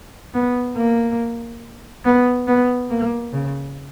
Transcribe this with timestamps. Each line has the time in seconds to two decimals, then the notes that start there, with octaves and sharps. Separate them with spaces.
0.34 B3
0.77 A#3
2.05 B3
2.47 B3
2.90 A#3
3.33 C#3